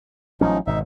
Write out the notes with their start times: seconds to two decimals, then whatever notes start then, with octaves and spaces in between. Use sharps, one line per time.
0.41 A1 F3 F#3 C#4 D#4
0.67 G#1 B2 D#4 E5